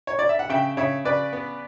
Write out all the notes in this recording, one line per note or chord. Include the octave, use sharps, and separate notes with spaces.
C#5
D5
E5
F#5
C#3 E5 G5
C#3 C#5 E5
C#3 B4 D5
B3